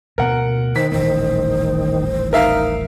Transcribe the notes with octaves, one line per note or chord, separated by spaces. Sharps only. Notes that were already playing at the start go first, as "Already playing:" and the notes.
D2 B2 A#3 A#4 F#5
D#3 C5 B6
D#1 A1 A#3 C5
D#4 A#4 E5 F5